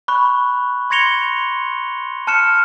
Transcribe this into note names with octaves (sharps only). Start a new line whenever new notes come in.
B5 C#6 F#6
C6 G#6 A#6 C#7 F7 G7
A5 F6 F#6 C#7 E7